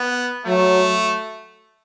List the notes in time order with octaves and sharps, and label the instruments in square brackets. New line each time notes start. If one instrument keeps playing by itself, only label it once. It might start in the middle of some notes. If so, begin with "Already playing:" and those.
Already playing: [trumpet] B3
[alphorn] F#3 [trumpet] A3